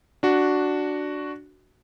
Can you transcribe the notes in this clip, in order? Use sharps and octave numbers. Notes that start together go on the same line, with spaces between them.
D4 F#4